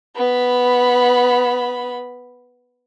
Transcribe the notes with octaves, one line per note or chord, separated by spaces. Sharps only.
B3 B5